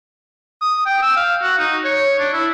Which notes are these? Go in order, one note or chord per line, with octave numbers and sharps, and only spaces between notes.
D#6
G5
E6
F5
F#4
D#4
C#5
D4
E4